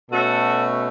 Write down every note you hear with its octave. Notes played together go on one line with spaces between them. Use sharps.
B2 A3 C#4 F#4 A4